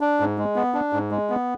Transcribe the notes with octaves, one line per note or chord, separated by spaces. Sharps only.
D4
G#2
G#3
B3
D4
G#2
G#3
B3